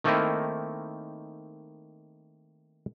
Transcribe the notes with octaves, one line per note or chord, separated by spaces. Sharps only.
D#3 A3 A#3 C4 D#4 E4